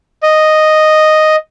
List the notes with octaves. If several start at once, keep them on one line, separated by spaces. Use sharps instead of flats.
D#5